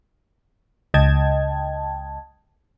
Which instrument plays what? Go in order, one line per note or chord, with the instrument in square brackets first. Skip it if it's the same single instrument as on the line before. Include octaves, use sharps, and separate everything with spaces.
[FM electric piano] C#2 D#5 G5 A5 G#6